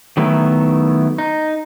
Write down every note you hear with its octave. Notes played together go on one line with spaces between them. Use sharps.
D#3 F#3 A3 B3 E4
D#4